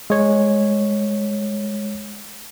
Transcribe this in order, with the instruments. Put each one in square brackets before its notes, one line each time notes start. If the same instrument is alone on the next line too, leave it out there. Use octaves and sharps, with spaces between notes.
[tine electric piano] G#3 C#5